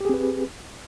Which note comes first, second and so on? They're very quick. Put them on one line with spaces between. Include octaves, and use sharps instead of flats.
G4 G#4 C4 B4